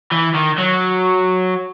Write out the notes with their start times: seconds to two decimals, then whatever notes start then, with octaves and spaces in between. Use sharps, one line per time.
0.12 E3
0.35 D#3
0.58 F#3